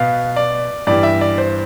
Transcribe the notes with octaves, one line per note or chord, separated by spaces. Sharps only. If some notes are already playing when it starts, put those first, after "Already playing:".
Already playing: B2 B3 F5
D5
G2 E3 G3 B3 D5
E5
D5
C5